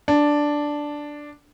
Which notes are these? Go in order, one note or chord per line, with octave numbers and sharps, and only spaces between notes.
D4